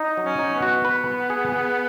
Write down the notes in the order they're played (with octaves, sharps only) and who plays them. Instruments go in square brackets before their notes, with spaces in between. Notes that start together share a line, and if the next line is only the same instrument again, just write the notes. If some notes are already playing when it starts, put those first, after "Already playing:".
Already playing: [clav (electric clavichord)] D#4
F#3
[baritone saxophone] C#4
[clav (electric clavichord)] D#4
[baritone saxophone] B3
[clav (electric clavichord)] F#4
B4
B4
G#4
G#4